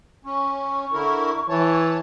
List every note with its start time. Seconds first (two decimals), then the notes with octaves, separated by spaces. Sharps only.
0.25 C#4 C#6
0.93 D3 E4 A#4
1.49 E3 C#5 A5